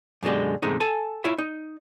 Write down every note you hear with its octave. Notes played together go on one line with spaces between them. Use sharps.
F#2 B2 D3 G#3 G4
E2 G#2 C3 G#3 A3 D#4
A4 G#5 A5
E4 F4 C#5 E5 B5
D#4